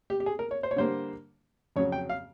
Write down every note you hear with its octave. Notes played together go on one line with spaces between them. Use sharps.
G4
G4
G#4
A#4
C#5
C5
C#5
D3 G3 A#3 C5
F2 C#3 F#3 C#5
G5
F5